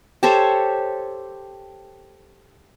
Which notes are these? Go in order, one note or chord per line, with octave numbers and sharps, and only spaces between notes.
G4 A4 C5 C#5